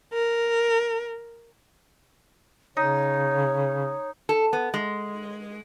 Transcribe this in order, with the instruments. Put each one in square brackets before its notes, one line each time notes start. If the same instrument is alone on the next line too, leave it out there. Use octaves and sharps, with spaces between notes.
[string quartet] A#4
[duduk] C#3 [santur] D#4 [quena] C#5
[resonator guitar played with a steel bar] A4
B3
G#3